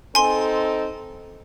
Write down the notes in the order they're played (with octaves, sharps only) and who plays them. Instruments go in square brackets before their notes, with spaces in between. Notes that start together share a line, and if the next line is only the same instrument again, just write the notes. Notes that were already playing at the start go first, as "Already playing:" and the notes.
[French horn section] C4 D#4 A4 [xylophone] G#5 C6